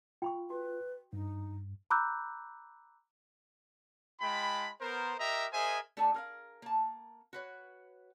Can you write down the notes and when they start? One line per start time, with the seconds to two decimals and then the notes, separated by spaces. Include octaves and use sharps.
0.22 F4 G5 B5 C#6
0.50 F#4 B4
1.13 G2 D#4
1.90 A#5 B5 D6 E6 F#6 G6
4.21 G#3 F4 G5 A5 B5
4.81 B3 A#4 C5
5.19 G4 A#4 D#5 E5 A#5
5.53 G#4 A#4 C5 D#5 E5 G#5
5.97 A3 D4 A4 D5 G#5
6.14 G#4 A#4 F5
6.62 A#3 A5
7.33 F#4 B4 C#5